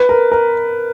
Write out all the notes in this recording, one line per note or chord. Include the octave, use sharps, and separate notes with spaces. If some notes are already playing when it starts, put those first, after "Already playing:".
Already playing: B4
A#4
A#4